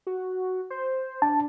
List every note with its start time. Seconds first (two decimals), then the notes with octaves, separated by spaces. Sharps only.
0.07 F#4
0.70 C5
1.22 D4 A5